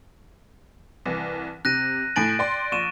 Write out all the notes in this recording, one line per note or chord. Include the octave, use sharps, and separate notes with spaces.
C2 E3
C3 F#6 A#6 D#7
A2 G#5 A6 D7 F#7
D5 G5 C6
A#1 C#6 D#7 E7